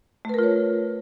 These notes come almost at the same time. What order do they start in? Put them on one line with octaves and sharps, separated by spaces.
A3 B4 A#4 F4 C#5